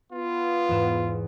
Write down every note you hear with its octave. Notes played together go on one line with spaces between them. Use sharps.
B3 F4
E2 G#2 E7